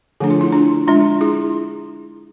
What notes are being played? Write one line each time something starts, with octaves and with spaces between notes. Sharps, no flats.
D3 F3 A3 D4 G#4
F4
E4
D4 F4
G#3 D4 F4
E4 G#4